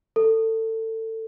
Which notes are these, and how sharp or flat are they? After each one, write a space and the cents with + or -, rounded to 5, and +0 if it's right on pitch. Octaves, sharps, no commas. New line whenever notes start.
A4 +25